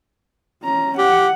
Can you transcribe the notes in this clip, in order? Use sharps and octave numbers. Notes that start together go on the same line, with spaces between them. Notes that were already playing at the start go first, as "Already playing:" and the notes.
C#4 A#5
G4 F#5